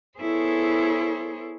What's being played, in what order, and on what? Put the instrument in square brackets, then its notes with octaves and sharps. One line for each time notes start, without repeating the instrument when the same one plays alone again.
[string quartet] B3 E4 G#4 A4 C5 C#5